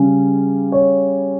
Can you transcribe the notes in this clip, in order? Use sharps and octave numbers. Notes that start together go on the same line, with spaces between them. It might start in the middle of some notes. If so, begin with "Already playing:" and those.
Already playing: C#3 G3 C#4
C#5